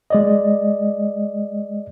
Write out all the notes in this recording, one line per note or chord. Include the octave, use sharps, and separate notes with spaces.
G#3 D5 D#5